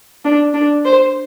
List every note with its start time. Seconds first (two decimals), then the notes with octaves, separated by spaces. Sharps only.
0.24 D4
0.54 D4
0.85 C5